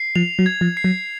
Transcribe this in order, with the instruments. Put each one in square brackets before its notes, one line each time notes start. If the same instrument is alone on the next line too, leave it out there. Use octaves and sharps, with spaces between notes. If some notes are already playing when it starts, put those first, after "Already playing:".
Already playing: [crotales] C7
[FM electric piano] F3 [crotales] F7
[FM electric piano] F#3
[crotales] G#6
[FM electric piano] F3
[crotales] C7
[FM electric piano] F#3